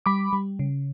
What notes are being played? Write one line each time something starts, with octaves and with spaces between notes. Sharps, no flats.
G3 B5 D6
G3
C#3